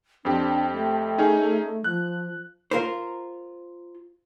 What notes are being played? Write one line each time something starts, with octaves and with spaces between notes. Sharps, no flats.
F2 C4 D4 G4
A3
C#4 D#4 G#4
F3 F#6
F4 A#4 C5